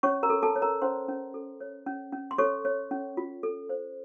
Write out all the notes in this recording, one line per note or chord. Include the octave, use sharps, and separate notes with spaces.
C#4 C#5 C#6
A#4 A#5
A4
A4 A5
C#5
A#4 A#5
C#4 C5 C6
C#4
A4
C#5
C#4
C#4
C6
A4 C#5 C#6
C#5
C#4
F4
A4
C5